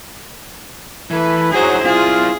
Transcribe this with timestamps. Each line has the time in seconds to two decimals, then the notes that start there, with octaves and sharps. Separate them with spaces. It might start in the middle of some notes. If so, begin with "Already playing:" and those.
1.11 E3 A3 E4 B4
1.52 F#3 D#4 E4 G#4 C5
1.85 C4 E4 F4 G#4